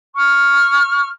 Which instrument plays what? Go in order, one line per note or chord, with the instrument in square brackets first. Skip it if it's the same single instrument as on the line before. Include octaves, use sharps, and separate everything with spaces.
[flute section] C#6 F6